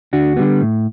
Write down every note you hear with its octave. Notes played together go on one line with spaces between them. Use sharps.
D2 D4 F#4
D3 G3 B3
A2